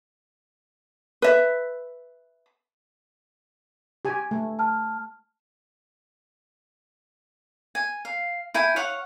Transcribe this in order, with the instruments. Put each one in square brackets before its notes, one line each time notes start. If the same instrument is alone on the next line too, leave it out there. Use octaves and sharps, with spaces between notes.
[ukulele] B4 E5
[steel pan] G4 G#5
A3
[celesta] A5 F6
[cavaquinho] G#5
F5
E4 G5 G#5
C#5 F5 F#5 C#6